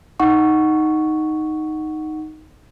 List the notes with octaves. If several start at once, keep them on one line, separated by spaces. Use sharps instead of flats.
D#4 F#5 C#6